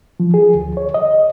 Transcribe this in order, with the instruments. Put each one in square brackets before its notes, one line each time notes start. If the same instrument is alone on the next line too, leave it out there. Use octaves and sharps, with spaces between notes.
[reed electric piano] F3
G#4
D2
C#5
D#5